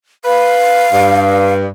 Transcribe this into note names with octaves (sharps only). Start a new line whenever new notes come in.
B4 F5
G2